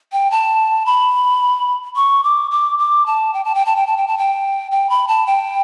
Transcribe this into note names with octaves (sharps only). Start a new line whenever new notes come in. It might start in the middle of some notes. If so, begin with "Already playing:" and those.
G5
A5
B5
C#6
D6
D6
D6
A5
G5
A5
G5
A5
G5
A5
G5
A5
G5
G5
B5
A5
G5